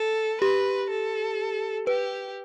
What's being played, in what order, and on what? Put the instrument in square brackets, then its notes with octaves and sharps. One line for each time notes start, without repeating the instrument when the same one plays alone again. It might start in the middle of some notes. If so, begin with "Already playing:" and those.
Already playing: [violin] A4
[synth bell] G4 [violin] B4
[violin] A4
[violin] G4 [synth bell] B4